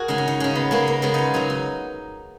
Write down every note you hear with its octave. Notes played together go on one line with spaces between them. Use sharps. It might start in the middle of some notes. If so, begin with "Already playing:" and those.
Already playing: F#4 G#4 A#4
C#3 G#3 D#4
C#4
D#4
C#3 G#3 C#4
B3
C#3 G#3 A#3
A#3
C#3 G#3 B3
D#4 F4
C#3 F#3 D#4
D#4